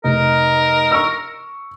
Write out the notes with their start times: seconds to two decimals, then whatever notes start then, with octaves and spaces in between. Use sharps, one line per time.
0.04 F1 D#4 A#4
0.91 C#6 E6